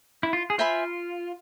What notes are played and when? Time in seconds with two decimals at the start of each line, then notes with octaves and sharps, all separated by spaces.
0.23 E4
0.33 F4
0.50 G#4
0.58 F4 C5 E5 G#5 B5